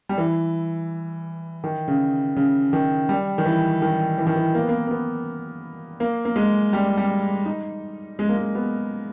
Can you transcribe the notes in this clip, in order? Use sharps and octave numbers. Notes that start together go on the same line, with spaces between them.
G3
E3
D#3
C#3
C#3
D#3
G3
D#3
E3
D#3
E3
D#3
E3
A#3
B3
A#3
A#3
B3
A#3
A#3
G#3
G3
G3
D#4
G#3
A#3
G#3
B3